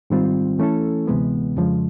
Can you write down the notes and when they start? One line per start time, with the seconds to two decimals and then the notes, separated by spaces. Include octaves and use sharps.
0.10 G#2 D#3 G3 C4 F4
0.59 E3 A3 C#4 E4 A4
1.07 D2 C3 E3 G#3 B3
1.57 F2 C#3 F3 G#3